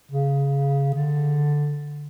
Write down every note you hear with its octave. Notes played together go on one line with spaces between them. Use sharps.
C#3
D3